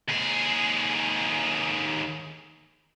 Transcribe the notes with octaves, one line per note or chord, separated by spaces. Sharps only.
D#2 G#4